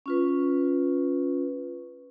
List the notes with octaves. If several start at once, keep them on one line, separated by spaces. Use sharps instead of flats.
C#4 F4 B4